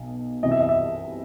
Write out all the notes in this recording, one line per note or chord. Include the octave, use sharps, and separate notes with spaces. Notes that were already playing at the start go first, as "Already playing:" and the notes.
Already playing: B1 B2
C2 C3 E3 D#5
E5
D#5
E5